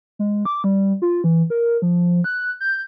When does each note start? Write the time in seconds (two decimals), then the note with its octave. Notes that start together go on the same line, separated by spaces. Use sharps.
0.19 G#3
0.45 D6
0.64 G3
1.02 F4
1.24 E3
1.50 A#4
1.82 F3
2.24 F#6
2.60 G6